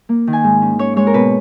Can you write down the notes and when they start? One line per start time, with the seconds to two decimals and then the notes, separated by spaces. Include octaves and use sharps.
0.09 A#3
0.27 D#3
0.33 G#5
0.44 G#2
0.62 C#4
0.79 C#4 C#5
0.96 G#3 C#5
1.07 A#4
1.14 B2 B4